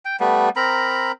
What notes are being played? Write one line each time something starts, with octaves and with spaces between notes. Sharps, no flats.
G5
G3 A3 B3
C4 A#4 A#5 B5